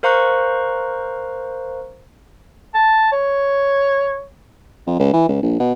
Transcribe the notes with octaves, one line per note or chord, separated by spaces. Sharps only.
A#4 C5 F5 A#5 C#6 F#6
A5
C#5
F2
C#2
E3
C#2
A#1
B2